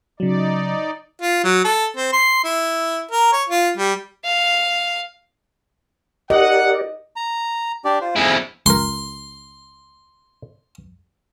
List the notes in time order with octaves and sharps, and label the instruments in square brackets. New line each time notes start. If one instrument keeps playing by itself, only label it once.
[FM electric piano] C#3 F#3 [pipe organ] D#4 D5
[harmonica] F4
F#3
A4
C4
C6
E4
A#4
C#5
F4
G3
[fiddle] F5
[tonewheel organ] G4 A#4 D5 [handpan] D#5 [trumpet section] F#5
[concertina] A#5
D4 G4 D5
F4 C5
[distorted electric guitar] F2 E4 [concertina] G#4 G#5
[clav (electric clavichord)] C#2 A#4 [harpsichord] C6